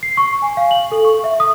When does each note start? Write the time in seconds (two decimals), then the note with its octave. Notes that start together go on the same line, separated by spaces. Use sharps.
0.03 C7
0.17 C#6
0.42 G#5
0.57 F5
0.71 F#7
0.92 A4
1.05 C#6
1.24 E5
1.40 D#6